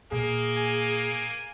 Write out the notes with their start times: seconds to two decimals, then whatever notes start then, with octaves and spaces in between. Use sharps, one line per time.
0.12 A#2 A#3 G#4
0.57 G#5